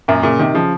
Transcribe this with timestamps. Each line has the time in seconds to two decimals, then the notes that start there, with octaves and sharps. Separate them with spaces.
0.08 F#2 A#2
0.23 A#2 C#3
0.39 C3 D#3
0.54 C#3 F3